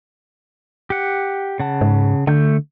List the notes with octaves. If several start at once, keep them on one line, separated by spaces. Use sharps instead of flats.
G4 F#5
C#3 F#5 A5
G#2
D3 A3 G6